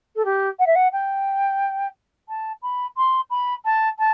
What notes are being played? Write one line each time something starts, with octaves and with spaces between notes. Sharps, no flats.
A4
G4
F#5
E5
F#5
G5
A5
B5
C6
B5
A5
A5